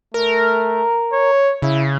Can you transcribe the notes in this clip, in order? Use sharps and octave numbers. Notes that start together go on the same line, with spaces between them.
A3 A#4
C#5
C#3 E4